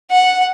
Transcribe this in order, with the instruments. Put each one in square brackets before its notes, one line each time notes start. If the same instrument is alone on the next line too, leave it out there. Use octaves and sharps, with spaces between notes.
[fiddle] F#5